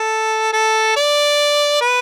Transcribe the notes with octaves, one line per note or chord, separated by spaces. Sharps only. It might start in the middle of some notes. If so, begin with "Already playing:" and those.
Already playing: A4
A4
D5
B4